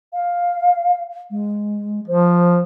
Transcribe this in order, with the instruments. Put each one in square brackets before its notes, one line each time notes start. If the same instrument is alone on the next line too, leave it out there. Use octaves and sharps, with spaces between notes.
[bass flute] F5
G#3
[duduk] F3 [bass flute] C5